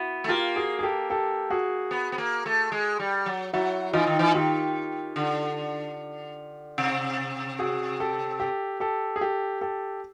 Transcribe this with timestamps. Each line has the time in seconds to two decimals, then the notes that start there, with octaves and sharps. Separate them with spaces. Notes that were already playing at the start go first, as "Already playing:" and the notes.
Already playing: B3 E4 F#4
0.24 A3
0.28 A#3 F4 G4
0.56 F#4 G#4
0.79 G#4
0.83 G4 A4
1.10 G4 A4
1.50 F#4 G#4
1.91 B3
2.12 B3
2.18 A#3
2.46 A3
2.72 G#3
2.99 G3
3.26 F#3
3.53 F#3 E4 F#4
3.93 E3 D#4 F4
4.07 D#3
4.19 E3
4.34 D#3 F4 G4
5.16 D3
6.78 C3
7.59 F#4 G#4
8.00 G4 A4
8.40 G4 A4
8.80 G4 A4
9.16 G#4
9.21 G4 A4
9.61 G4 A4